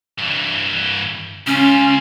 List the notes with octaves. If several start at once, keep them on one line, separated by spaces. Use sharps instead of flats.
G2 E3
C#2 C#4 F4